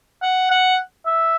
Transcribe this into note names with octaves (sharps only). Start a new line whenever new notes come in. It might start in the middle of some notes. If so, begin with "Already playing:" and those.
F#5
F#5
E5